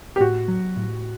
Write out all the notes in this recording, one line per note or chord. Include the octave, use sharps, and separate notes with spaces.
G4
A2 F#4
F#3
A2